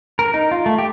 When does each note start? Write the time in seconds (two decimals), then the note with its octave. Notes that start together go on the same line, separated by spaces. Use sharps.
0.19 A#4
0.34 D#4
0.51 F4
0.66 A3
0.78 G4